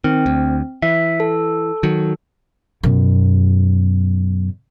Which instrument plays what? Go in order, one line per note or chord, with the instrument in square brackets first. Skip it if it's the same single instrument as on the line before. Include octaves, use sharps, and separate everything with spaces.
[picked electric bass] D#3 [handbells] C4
[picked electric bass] D2
[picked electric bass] E3 [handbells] E5
[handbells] A4
[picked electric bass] D#3 F#3
[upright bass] F#2 B2